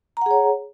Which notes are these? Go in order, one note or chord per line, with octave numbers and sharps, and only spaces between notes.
G#4 C#5 F#5 A#5